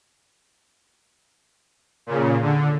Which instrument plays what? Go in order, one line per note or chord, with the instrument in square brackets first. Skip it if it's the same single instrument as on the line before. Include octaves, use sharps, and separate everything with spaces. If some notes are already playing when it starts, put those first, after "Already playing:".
[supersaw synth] A#2 C#3
D3